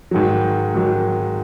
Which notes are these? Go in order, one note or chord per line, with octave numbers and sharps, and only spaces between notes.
G#2 D#3 F#3
G#2 D#3 F#3